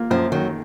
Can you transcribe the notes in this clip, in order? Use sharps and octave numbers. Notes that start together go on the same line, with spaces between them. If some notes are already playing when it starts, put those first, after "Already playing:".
Already playing: A#3 F4
F#2 F3
D#3 F#3